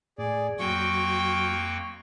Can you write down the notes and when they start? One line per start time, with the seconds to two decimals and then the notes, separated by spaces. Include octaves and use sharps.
0.18 A2 G#4 D5
0.59 F2 F#3 A#3 G5 C#6